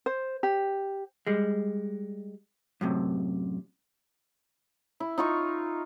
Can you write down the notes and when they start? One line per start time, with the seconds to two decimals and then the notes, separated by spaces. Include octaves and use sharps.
0.06 C5
0.43 G4
1.27 G3 G#3
2.81 F#2 A2 C3
5.00 E4
5.18 D#4 F4 C#6